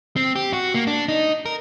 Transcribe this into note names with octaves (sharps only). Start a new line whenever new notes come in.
C4
G4
F#4
A#3
D4
D#4
A#4